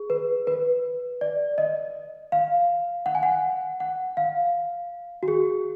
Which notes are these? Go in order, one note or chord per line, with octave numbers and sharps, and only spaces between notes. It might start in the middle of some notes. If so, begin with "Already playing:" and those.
Already playing: G#4
B4
B4
D5
D#5
F5
F#5
G#5
F#5
F#5
F5
F#4
G#4